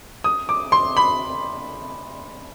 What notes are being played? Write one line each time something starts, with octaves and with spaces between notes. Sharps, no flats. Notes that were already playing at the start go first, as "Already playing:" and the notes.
D#6
D6
C6
B5